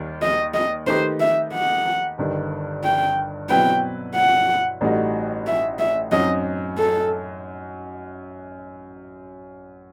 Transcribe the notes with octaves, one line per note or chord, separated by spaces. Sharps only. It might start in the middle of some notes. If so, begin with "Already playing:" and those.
Already playing: D#2 D#3 G3
D#5
D#5
D#3 A3 D#4 G4 B4 C5
E5
F#5
G1 G2 D#3
G5
B2 F#3 C4 E4 B4 G5
F#5
A1 A2 G3 D#4 F#4
E5
E5
F#2 F#3 C4 D#4 D#5
A4